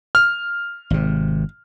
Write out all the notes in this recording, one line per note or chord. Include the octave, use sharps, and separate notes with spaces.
F6
G#1 C3